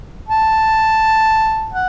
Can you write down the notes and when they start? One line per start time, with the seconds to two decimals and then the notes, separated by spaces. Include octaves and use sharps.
0.29 A5
1.73 F#5